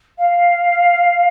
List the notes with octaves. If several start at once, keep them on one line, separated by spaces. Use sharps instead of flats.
F5